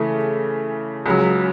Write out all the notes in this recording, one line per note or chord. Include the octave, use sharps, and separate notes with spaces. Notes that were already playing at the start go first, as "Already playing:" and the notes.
Already playing: C#3 E3 A3
C#2 C#3 F#3